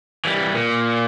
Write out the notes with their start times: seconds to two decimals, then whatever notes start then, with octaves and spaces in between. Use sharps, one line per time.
0.25 E3 G3
0.53 A#2